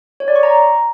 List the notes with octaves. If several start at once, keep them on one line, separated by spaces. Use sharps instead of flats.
C#5
D5
C#6
A#5